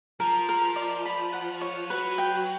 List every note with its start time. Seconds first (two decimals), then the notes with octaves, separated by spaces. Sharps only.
0.20 F3 A#4
0.49 A#4
0.76 D5
1.05 B5
1.33 F#5
1.61 C#5
1.90 F#3 B4
2.18 G5